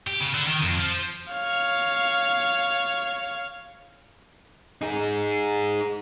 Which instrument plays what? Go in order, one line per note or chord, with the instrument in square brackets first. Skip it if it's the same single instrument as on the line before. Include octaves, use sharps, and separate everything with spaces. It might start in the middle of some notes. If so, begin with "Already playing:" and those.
[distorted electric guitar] G4
C#3
D3
D#3
F2
F3
[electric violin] C#5 F5
[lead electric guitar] D#4 G#4